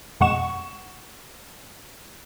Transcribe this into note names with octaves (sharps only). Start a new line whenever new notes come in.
F2 B2 G#3 F#5 C#6 E7